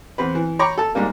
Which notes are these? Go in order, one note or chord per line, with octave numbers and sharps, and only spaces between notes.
E2 C4 B4
E3
C#5 G5 A#5 B5 C#6 D6
A4 A5
G#2 G3 A#3